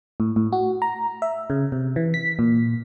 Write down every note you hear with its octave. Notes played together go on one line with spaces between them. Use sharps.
A2
A2
F#4
A#5
E5
C#3
C3
E3
B6
A#2